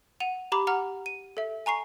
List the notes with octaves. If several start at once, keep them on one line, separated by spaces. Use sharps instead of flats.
F#5 D#7 F7
G4 A#5 B5 D6
F#5 A#5 F6
D#7
A4 E5
G#5 A#5 C#6 C7